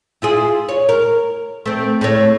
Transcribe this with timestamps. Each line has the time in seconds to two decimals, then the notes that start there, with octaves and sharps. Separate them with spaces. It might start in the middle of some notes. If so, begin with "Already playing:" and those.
0.22 E4 F4 G#4
0.69 C#5
0.89 A#4
1.66 A3 C4
2.01 A2 A3 C#5